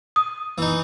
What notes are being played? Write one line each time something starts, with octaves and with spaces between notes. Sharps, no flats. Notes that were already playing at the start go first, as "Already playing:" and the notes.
D#6
E3 D#4